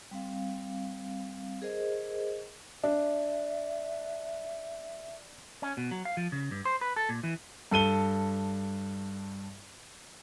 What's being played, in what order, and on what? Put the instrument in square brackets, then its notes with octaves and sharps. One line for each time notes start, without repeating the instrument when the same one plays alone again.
[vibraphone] G3 C4 F5
G#4 A#4 C5 D#5
[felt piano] D4 [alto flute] E5
[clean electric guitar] C#4
B2
F#3
F5
F3
C#3
G2
C5
B4
A4
A#2
E3
[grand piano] G2 A4 D#7 G7